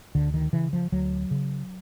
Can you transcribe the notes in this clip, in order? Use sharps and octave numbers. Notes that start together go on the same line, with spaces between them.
D2 D3
D#3
C#3 E3
F3
D2 F#3
C#3